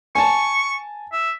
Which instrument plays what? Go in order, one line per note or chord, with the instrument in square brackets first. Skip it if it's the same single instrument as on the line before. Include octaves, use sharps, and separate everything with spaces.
[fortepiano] G#5 A5 [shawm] C#6
[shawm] E5